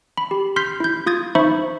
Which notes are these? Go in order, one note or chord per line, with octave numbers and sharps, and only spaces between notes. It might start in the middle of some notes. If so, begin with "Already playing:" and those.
B5
G4
C6 F6 G6 B6 C7
E4 G6
F4 D#6 G#6 A6
D#4 C5 E5 B5 C#6